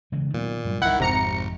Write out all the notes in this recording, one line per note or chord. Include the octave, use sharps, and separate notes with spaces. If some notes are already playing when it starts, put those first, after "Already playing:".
C#3 E3 G#3
A#2 D#3 F#3 B3
G2 F#3 G3
C2 D#3 G3 E4 F#5
G#1 F2 C3 A#5 C#7